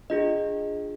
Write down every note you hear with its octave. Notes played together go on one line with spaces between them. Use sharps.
D4 F4 G#4 D#5